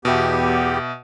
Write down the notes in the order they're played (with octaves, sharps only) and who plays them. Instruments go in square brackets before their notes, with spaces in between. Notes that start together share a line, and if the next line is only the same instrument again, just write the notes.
[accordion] E2 B3 G4 [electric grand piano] B2 E5